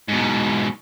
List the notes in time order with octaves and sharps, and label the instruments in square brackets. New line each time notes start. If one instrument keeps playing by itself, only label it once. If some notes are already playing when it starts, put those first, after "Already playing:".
[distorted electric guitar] G#2 B2